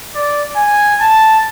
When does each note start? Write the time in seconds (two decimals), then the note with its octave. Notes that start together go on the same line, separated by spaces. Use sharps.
0.15 D5
0.56 G#5
1.01 A5